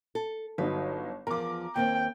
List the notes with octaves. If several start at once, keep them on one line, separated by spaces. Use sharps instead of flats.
A4
G1 F#3 D#4 B4
E2 F3 A#4 D6
D#2 A#3 C4 G5